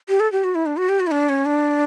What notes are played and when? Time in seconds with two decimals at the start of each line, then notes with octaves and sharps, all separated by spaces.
0.09 G4
0.20 A4
0.32 G4
0.44 F#4
0.55 E4
0.66 D4
0.77 F#4
0.89 G4
1.00 F#4
1.07 E4
1.11 D4
1.29 C#4
1.45 D4